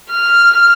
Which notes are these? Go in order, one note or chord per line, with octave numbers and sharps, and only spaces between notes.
F6